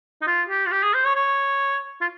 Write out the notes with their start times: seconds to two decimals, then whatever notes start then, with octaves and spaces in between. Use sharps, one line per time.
0.22 D#4
0.27 F4
0.49 G4
0.66 F4
0.71 G4
0.83 G#4
0.94 C5
1.05 C#5
1.16 C#5
2.01 F4